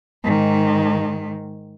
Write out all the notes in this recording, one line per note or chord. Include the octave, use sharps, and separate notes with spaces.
G#2 D#3